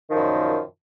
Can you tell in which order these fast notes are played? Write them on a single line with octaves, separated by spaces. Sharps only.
D#3 F3 F#2 A#2